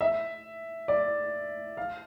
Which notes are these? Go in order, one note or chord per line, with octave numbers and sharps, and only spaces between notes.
E5
D5
F5